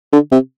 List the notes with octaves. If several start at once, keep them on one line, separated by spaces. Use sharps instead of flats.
D3
C3